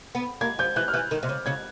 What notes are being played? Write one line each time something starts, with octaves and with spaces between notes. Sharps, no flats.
B3
A#3 G#6
F3 G6
E3 F#6
F6
E3 F#6
D#3
C3
C#3
C#3 G#6